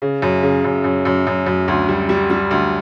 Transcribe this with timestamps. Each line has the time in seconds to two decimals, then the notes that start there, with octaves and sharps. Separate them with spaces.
0.02 C#3
0.22 F#2
0.43 C#3
0.64 F#2
0.84 F#2
1.05 F#2
1.27 F#2
1.46 F#2
1.68 D2
1.88 G3
2.09 G3
2.30 G3
2.51 D2